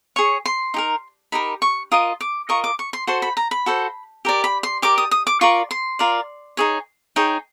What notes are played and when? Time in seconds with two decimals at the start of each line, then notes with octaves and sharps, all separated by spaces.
0.16 G#4 C#5 C#6
0.46 C6
0.74 D#4 G4 A#4
1.32 D#4 G4 A#4 B5
1.62 C#6
1.92 F4 A#4 D#5 D#6
2.21 D6
2.49 F4 A#4 D#5 C#6
2.64 D6
2.79 C#6
2.93 C6
3.07 F#4 A4 C5 C6
3.22 B5
3.37 A#5
3.51 B5
3.66 F#4 A4 C5
4.25 G4 A#4 D5
4.44 B5
4.63 C6
4.82 G4 A#4 D5 D6
4.98 D#6
5.11 D#6
5.27 D6
5.41 F4 A#4 D5 C#6
5.71 C6
5.99 F4 A#4 D5
6.57 D#4 G#4 C#5
7.16 D#4 G#4 C#5 G5